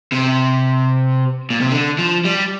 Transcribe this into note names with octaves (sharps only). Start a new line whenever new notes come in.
C3
A#2
C3
D3
F3
G3